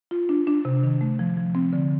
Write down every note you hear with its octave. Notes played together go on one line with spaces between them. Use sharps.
F4
D4
D4
C3
D#3
A3
F3
F3
C4
D3